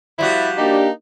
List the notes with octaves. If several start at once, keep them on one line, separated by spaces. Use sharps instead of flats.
F3 G3 E4 F#4
A#3 D4 D#4 G4